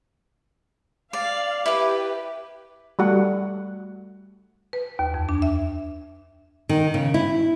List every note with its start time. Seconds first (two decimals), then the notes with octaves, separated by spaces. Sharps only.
1.13 D5 F5
1.66 E4 G4 B4 D6
2.99 G3 A3 F#4 F#5
4.73 B4
4.99 D#2
5.14 F2
5.29 D4
5.42 E5
6.69 D#3
6.94 C#3
7.14 E4